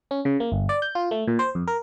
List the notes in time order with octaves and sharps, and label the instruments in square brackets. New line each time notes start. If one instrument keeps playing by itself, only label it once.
[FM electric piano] C#4
C#3
A#3
G1
D5
G6
F4
A3
A#2
C5
F2
A#4